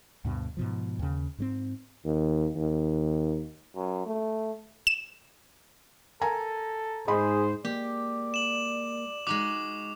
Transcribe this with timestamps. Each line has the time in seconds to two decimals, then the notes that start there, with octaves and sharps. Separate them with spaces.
0.25 D2 G2 B2
0.57 G#2 B2 F3
0.99 D#2 C#3
1.38 G#2 F#3 C4
2.05 D#2
2.55 D#2
3.76 F#2
4.07 A3
4.87 E7
6.22 A4 A#4 G#5 A#5
7.08 G#2 G#4 C5 D#5 B5 C6
7.65 G#3 A#3 G4 D5
8.34 E7 F#7
9.27 G#3 D#4 F#4 D6